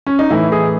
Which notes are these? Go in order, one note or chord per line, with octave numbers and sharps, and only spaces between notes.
C#4
D#4
A2 E3 E4
G#4